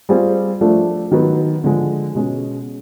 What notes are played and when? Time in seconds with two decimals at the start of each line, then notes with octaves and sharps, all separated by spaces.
0.09 G3 C4 F4 G#4
0.61 F3 A3 D4 F4
1.11 D#3 F#3 B3
1.64 D3 F3 G#3
2.15 B2 G#3 C#4